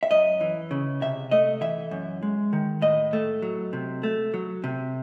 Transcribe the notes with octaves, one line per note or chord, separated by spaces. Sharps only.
E5
F#2 D#5
E3
C#3
C3 E5
A3 D#5
E3 E5
F#2
G#3
D#3
A2 D#5
A3
F#3
C3
A3
F#3
C3